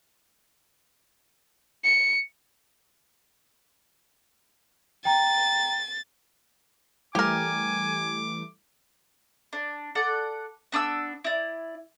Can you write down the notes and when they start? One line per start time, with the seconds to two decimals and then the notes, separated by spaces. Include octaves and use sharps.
1.84 C#7
5.05 G5 A#5 A6
7.15 E3 G3 A3 G4 A#4 G#5 D6
9.53 D4
9.95 A4 D5 F#5
10.72 B3 D4 D6 E6
11.24 E4 D5